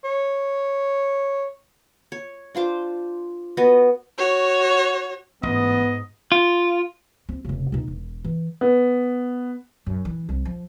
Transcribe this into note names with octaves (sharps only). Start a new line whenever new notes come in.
C#5
C#5
D4 F4 C5 D6
B3 F#4 D#5
F#4 C#5
A1 G#2 B3 D#5
F4
C4
F1 C#3
B2 D#4
E1
E3
B3
F#2
E3
C2
F3